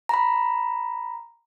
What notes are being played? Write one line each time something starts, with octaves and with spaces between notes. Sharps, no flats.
A#5 B5